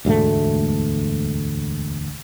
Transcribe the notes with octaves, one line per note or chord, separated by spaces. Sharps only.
E1 D2 G#2 A3